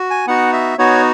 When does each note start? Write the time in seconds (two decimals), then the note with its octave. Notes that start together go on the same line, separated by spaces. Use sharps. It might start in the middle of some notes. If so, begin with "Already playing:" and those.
Already playing: F#4
0.10 G#5
0.27 B3 D#4 F#4 F#5
0.53 E5
0.78 B3 D#4 F#4 C#5